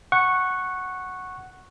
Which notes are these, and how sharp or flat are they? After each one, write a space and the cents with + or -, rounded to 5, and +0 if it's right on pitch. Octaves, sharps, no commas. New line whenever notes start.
F#5 +0 C#6 -10